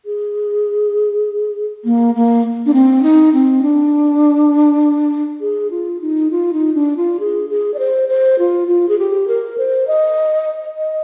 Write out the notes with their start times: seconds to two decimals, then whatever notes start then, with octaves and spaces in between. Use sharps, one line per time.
0.05 G#4
1.85 A#3
2.15 A#3
2.66 D4
2.73 C4
3.03 D#4
3.33 C4
3.62 D4
5.40 G#4
5.71 F4
6.01 D#4
6.31 F4
6.53 D#4
6.74 D4
6.97 F4
7.20 G#4
7.49 G#4
7.74 D5
7.79 C5
8.09 C5
8.39 F4
8.67 F4
8.88 G#4
8.98 G4
9.27 A#4
9.58 C5
9.87 D#5
10.77 D#5